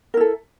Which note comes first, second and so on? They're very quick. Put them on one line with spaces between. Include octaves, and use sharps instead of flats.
A#4 E4 A4